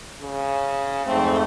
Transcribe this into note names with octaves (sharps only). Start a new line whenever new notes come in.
C#3
F2 G#2 A3 C4